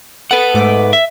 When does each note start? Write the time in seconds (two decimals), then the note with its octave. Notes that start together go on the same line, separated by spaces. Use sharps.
0.31 A4 B4 F#5 D7
0.54 G#2 A3 D6
0.93 E5